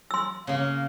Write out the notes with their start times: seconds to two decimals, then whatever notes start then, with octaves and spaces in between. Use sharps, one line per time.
0.11 C6 E6
0.47 C#3 A#3 F5